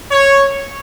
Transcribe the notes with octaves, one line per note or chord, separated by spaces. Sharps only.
C#5